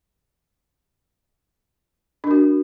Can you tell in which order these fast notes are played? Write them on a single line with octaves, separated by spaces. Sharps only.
D4 A#4 F#4